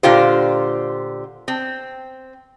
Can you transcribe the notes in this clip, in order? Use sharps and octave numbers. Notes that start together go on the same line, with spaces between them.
A#2 D3 F4 G4 C5
C4